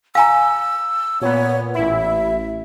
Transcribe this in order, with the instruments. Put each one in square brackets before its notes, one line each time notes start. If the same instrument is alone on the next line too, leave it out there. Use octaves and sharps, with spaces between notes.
[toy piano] F5 G#5 A#5 [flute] E6
[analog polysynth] A#2 B3 [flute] C#5
[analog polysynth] A1 E4 [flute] E5